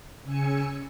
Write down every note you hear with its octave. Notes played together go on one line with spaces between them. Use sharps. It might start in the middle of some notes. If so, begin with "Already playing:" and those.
C#3 G#5 E6 C#7